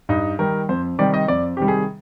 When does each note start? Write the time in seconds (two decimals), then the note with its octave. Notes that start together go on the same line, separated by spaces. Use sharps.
0.09 G2 D#4
0.39 D#3 G3 A#4
0.69 F2 C5
0.99 C3 D#3 G3 D5
1.14 D#5
1.28 F2 D5
1.57 C3 D#3 G3 G4
1.68 G#4